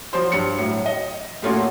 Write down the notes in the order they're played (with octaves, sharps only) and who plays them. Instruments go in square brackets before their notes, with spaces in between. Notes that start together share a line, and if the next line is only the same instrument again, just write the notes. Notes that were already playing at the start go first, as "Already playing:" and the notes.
[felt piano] F3 F#3 C5 C6
G2 C#7
A2 F#3
D#5
A2 A3 A#3 C#4 F4 F#4